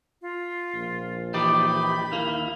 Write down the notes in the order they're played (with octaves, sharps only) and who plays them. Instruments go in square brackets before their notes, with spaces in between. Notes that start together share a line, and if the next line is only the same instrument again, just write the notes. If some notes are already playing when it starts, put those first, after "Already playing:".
[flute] F4
[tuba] A#1
[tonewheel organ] E3 G4 G5 [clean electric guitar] D#4 D5 [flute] B5
[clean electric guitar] D#2 A#3 [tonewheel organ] E4 F5